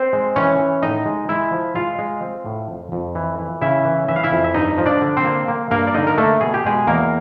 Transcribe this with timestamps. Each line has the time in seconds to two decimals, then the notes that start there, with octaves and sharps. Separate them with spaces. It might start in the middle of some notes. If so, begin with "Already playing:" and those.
Already playing: C4 C5
0.13 G#3
0.36 E3 C#4 C#5
0.59 E3
0.83 A2 D#4 D#5
1.06 G#3
1.29 G#3 E4 E5
1.52 F3
1.75 G#3 F4 F5
1.99 G#3
2.22 C4
2.45 A2
2.69 F2
2.92 F2
3.15 E3
3.39 E3
3.61 C#3 E4 E5
3.85 E3
4.08 E3 E5
4.16 F5
4.23 E4 E5
4.31 F2
4.44 E5
4.54 G2 D#4 D#5
4.78 F3
4.86 D4 D5
5.01 D3
5.17 C4 C5
5.24 A#3
5.48 A#3
5.71 G2 A#3 A#4
5.87 D5
5.94 D3 D#4 D#5
6.07 A#4
6.18 A3 A#3 A4
6.41 B2 G#4
6.54 G4
6.64 B2 G#3 G#4
6.87 E2 A#3 A#4